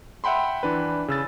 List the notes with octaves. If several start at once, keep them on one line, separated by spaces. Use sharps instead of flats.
E5 F#5 G5 B5 C6
E3 D4 B4
C#3 E6 A6